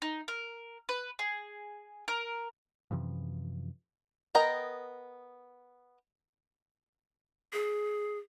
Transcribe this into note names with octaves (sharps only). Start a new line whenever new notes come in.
D#4
A#4
B4
G#4
A#4
F#2 C3 E3 F3
B3 A#4 D#5 G5 A#5
G#4